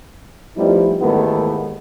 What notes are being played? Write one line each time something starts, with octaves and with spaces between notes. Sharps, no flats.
F3 G3 A3 B3 D#4 E4
D#2 G#2 E3 A3 B3